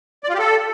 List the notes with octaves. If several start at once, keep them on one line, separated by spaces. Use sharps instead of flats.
D5
F4
G4
A4